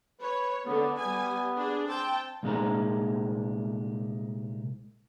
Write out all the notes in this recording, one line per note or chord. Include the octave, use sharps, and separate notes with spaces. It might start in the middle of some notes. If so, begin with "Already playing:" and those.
B4 C#5
D3 B3
G3 B3 G#5
D4 G#4
C4 G5 A5
C2 A#2 G#3 D#4 A#5